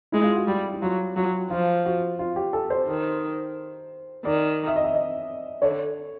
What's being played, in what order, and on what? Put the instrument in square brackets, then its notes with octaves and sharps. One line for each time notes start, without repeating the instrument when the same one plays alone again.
[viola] G#3 [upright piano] E4
[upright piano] F4
F#4
[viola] G3 [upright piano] G4
[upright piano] E4
[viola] F#3 [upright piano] F4
[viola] F#3 [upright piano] F4
[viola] F3 [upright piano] F4
[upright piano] F#4
F4
G4
A4
C5
[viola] D#3
[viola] D#3 [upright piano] D5
[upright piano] E5
D#5
E5
D#5
[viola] D3 [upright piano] C#5